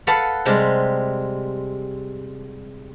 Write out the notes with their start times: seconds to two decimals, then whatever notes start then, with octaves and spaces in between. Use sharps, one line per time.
0.07 A4 B4 F5 F#5 A5
0.45 C3 G3 G#3